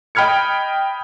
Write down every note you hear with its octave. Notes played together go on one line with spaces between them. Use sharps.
D#5 G5 B5 F6 G#6 C#7